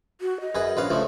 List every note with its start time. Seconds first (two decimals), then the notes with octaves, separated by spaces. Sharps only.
0.21 F#4
0.41 D#5
0.55 F#2 G#4 B4
0.77 A#1 C#4 B4 F5
0.91 C#2 F3 A3